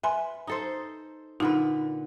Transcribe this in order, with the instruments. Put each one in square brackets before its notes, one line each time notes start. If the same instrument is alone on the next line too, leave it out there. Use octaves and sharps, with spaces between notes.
[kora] B4 [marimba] E5 G#5 C6
[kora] D#4 A4 C5
[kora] A#2 D3 B4 [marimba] D#4